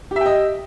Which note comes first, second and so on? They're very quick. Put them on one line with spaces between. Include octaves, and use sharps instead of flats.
G4 E5 G5 D#5